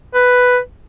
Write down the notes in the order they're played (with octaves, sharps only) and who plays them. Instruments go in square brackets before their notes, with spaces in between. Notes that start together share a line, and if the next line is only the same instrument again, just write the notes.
[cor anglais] B4